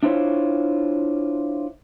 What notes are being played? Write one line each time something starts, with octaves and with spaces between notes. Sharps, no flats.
D4 E4 F4 C5 C#5